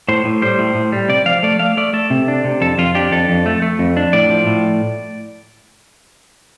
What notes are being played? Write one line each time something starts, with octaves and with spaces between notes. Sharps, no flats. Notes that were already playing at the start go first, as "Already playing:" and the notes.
A2 C5
A2
G3 C5
A2
A2
G3
C3 D5
F3 F5
A3 D5
A3 F5
A3 D5
A3 A4
C3
D4
C3
F2 A4
F2 F4
D4 G4
F2 A4
F2
A3
A3
F2
D4
A2 D5
F3
A2